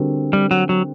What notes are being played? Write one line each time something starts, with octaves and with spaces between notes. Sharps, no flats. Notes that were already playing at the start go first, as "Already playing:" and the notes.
Already playing: D3 G3 C4 F#4 A#4
G3
F#3
F#3